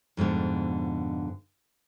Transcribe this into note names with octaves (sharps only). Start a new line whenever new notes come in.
F2 G#2 B2 D3